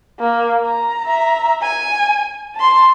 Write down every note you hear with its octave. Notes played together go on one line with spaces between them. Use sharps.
A#3
A#5
E5 A#5
G#5
A5 C6